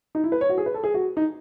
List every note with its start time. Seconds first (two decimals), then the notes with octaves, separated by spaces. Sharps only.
0.15 D#4
0.24 E4
0.32 B4
0.41 C#5
0.49 F#4
0.58 G#4
0.66 B4
0.74 A4
0.84 G#4
0.94 F#4
1.17 D#4